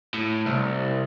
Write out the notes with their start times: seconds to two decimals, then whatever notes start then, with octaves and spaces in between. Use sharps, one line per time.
0.14 A2
0.46 C2